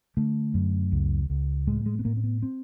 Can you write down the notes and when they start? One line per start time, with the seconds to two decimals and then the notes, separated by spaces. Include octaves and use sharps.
0.17 D3 A3
0.54 F#2
0.92 C#2
1.30 C#2
1.67 A2 G#3
1.86 G#3
1.99 B3
2.05 A2 A#3
2.17 C4
2.24 B3
2.43 C4